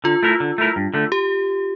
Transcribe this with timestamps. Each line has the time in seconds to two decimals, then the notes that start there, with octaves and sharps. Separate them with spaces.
0.04 D3 F4
0.23 A3 E4 A#4
0.40 D3
0.58 A3 E4 A#4
0.76 G2
0.94 D3 A3
1.12 G4